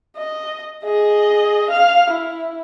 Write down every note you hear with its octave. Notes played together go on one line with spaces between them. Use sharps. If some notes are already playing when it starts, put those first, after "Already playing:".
D#5
G#4 D#5
F5 F6
E4